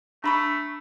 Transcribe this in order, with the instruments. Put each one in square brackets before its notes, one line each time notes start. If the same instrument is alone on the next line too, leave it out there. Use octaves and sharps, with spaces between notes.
[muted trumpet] A3 [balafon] D4 B5 C#6